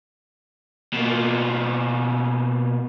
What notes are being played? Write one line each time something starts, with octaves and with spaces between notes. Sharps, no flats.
B2 A#3